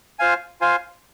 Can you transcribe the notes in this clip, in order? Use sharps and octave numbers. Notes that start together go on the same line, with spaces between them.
F4 C5 F5 G#5
F4 C5 F5 G#5